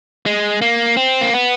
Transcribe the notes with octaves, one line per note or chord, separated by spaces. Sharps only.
G#3
A#3
C4
A#3
B3